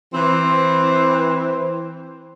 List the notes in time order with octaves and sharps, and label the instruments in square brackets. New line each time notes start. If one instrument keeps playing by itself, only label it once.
[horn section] E3 C4